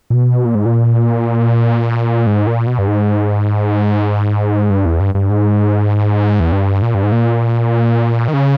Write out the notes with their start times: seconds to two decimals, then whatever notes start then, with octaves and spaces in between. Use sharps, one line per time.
0.10 A#2
0.14 B2
0.45 A#2
0.55 G#2
0.66 A#2
2.27 G#2
2.47 A#2
2.67 B2
2.79 G2
2.88 G#2
4.70 G2
4.85 E2
5.00 G2
5.15 G2
5.30 G#2
6.40 E2
6.52 G2
6.82 A#2
6.95 G2
7.03 G#2
7.12 A#2
8.28 D#3
8.34 C#3